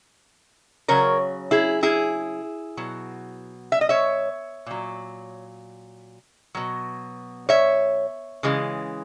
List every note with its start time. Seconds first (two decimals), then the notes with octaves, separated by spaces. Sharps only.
0.88 C#3 F#3 A#4 C#5
1.51 E4 G#4
1.83 E4 G#4
2.77 B2 F#3
3.72 E5
3.81 D#5
3.89 C#5 E5
4.66 A#2 F#3
6.55 B2 F#3
7.49 C#5 E5
8.43 C#3 E3 G#3